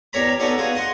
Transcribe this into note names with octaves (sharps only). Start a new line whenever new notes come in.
E2 G3 A#4 C#5 A#5 B5
G3 B3 C#4 D#4 F#4 A4
B3 F4 F#4 G#4
D#5 F#5 C6 C#6